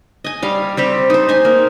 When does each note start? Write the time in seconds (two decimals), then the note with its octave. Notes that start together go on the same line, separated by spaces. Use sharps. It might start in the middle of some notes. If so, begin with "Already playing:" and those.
0.24 D#5 G#5
0.42 G3 F5
0.77 G3 C4 G4
1.10 D#4 C5
1.29 D#4 G#5
1.45 A#3